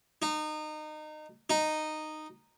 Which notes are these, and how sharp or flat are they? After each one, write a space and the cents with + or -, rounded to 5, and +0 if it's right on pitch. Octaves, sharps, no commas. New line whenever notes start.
D#4 -25
D#4 -10